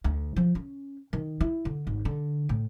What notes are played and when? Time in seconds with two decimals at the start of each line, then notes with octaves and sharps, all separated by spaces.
0.04 D2
0.36 F3
0.55 C#4
1.13 D#3
1.41 E4
1.65 D3
1.87 G#1
2.05 D3
2.49 A2